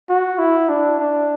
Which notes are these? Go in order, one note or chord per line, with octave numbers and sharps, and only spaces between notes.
F#4
E4
D4
D4